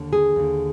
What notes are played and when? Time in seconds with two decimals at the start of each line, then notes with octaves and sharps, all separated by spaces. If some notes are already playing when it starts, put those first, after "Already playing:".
Already playing: D#2 D3
0.13 G#4
0.36 D#2 D3